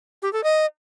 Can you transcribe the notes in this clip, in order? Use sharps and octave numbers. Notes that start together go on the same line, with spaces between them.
G4
A4
D#5